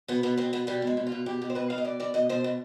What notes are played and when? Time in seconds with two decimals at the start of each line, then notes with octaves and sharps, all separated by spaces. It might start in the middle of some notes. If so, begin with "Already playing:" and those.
0.08 B2 B3
0.23 B2 B3
0.37 B2 C4
0.53 B2 B3
0.67 B2 G3
0.82 B2 G#3
0.97 B2
1.07 F4
1.12 B2
1.26 B2 G4
1.42 B2
1.50 C5
1.55 B2 B4
1.70 B2 F5
1.78 D#5
1.85 B2 D5
2.00 B2 D5
2.14 B2 D#5
2.29 B2 C5
2.44 B2